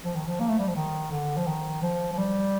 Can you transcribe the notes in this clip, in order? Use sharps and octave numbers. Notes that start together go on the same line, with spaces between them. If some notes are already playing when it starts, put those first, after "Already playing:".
F3
D#3
F3
A#3
A3
G3
F3
D#3
D3
F3
D#3
F3
F3
G3